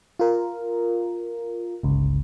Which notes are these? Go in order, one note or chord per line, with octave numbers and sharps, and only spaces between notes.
F4 A#4
G1 C#2